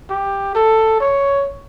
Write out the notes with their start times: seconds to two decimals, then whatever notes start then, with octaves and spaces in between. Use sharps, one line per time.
0.10 G4
0.55 A4
1.00 C#5